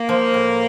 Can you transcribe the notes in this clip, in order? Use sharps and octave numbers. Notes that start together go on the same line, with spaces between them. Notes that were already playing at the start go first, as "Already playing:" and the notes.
Already playing: A#3
F3
A2